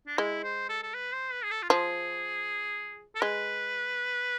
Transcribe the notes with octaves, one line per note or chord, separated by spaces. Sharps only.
D4
G#3 E4
C5
A4
A4
B4
C5
B4
G#4
A4
F4
F3 G#4
A4
G#3 B4